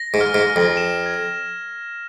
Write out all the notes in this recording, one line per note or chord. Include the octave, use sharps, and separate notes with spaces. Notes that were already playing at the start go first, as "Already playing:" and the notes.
Already playing: A#6
G#2
F6
G#2
F6
F2
E7
G#6